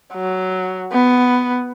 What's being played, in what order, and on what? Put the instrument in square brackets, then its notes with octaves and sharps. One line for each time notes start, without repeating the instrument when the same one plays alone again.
[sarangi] F#3
B3